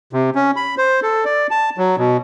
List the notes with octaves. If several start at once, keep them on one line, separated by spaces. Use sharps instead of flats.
C3
C#4
B5
C5
A4
D5
A5
F#3
B2